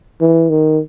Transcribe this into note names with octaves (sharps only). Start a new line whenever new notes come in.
E3
D#3